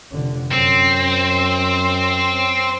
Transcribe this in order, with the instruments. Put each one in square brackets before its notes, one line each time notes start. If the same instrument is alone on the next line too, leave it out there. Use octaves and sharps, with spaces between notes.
[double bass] F1 D3
[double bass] F#2 [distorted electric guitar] C4